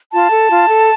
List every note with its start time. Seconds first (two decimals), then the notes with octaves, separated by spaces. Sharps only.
0.12 F4 A5
0.31 A4
0.49 F4
0.69 A4